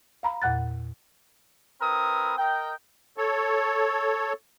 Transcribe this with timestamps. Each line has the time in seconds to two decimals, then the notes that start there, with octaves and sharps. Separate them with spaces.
0.23 F5 A#5 B5
0.42 E2 A#2 F#5 F#6 A6
1.80 C4 E4 A#4 B4 D#6
2.38 A#4 D#5 G5
3.18 A4 C#5